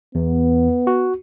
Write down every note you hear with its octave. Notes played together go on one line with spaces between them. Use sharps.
E2 B3
F#4